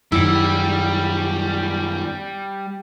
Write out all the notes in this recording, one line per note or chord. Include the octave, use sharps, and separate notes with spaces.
F#2 D#3 G3 E4